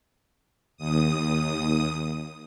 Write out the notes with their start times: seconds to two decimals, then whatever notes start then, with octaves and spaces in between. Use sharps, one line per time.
0.77 D#2 D#6